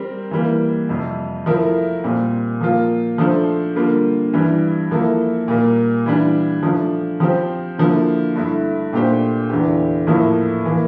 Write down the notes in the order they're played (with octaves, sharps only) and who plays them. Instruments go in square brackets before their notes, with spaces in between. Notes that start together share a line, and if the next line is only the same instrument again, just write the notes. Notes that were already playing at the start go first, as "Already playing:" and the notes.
Already playing: [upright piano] G3 C4 G4 A#4
E3 G3 A#3
F2 C3 G3
F3 A3 E4 A#4
A#2 G3 C4
F3 A#3 F4
F3 A3 D4 A4 C5
D3 G3 A#3 F4
G2 E3 G3 D4
F3 A#3 E4 A4
A#2 G3 A#3
E3 G3 D4
F3 A3 D4
F3 C4 G4 C5
D3 F3 A#3 E4
G2 D3 A3 E4
A#2 A3 D4 G4 C5
E2 D3 A3 E4 G4
A2 F3 A#3 E4 A4
E3 A#3